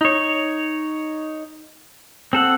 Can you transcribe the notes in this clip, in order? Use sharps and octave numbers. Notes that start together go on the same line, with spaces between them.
D#4 C#5
C4 A4 F#5